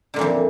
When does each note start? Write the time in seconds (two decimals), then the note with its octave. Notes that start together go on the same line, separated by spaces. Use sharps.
0.14 D3
0.16 A#2
0.19 E3
0.21 F2